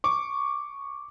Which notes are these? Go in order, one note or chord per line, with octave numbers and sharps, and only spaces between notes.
C#6 D6